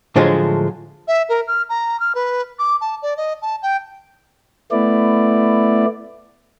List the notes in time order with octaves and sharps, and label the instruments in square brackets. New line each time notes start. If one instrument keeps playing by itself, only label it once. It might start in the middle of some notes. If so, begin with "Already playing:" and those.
[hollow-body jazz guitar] A2 D3 F3 F#3 G#3
[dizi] E5
A#4
F6
A#5
F6
B4
D6
A5
D5
D#5
A5
G5
[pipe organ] A3 B3 E4 D5